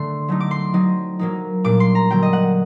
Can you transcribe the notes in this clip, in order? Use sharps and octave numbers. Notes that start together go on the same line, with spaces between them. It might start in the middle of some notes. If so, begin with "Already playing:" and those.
Already playing: D3 A3 D4 C6
F#3 A3 D#4
D6
C6
F#3 C4 D#4
F#3 A#3 D#4
A#2 G3 A#3 D4 D6
C6
A#5
D3 F#3 A#3 G5
D#5
F#5